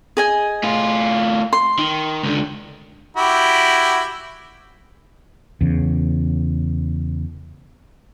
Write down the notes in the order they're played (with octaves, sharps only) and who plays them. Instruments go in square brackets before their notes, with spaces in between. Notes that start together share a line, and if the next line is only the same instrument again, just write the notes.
[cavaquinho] G#4 D#5 G#5
[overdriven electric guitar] A2 F4
[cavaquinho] C6
[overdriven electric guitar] D#3
C#2 D3
[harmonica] E4 F#4 G4
[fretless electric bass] E2 C#3